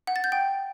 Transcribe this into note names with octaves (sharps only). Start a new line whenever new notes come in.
F#5
A6
G6
G5